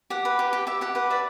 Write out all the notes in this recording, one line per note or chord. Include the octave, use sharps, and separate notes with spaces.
G4 F#5
B4
G4
G4
G4 E5
G4 F#5
B4 F#5
D5 E5